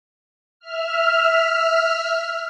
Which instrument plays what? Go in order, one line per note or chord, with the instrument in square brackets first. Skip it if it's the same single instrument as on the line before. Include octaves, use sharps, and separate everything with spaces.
[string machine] E5 F6